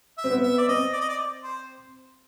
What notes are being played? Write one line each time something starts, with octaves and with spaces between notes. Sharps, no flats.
E5
C4
B3
E5
D5
C4 D#5
D5
D#5
D5
C5